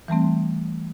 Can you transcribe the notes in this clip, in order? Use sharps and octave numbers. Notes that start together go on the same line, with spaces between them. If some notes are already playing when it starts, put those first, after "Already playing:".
E3 G3 A3 C4